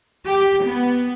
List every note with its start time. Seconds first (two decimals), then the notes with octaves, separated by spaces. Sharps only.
0.25 G4
0.65 B3